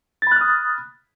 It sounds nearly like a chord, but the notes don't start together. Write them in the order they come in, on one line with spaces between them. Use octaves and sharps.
A6 B5 F#6 F6 D#6